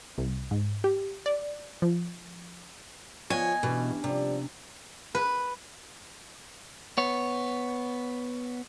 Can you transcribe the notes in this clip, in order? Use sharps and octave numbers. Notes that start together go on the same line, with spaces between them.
C2
G#2
G4
D5
F3
F3 B3 F4 C#5 D#5 G#5
B2 E3 C#4 D4 G4
C3 F3 G3 D5
B4
B3 C#5